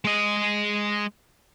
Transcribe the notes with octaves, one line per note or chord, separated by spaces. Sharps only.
G#3 D#5